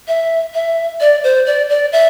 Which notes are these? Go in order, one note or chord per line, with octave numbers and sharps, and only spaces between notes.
E5
E5
D5
C5
D5
D5
E5